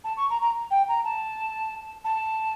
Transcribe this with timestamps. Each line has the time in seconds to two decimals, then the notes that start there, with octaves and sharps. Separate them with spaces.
0.04 A5
0.17 C#6
0.30 A#5
0.41 A#5
0.71 G5
0.88 A#5
1.04 A5
2.04 A5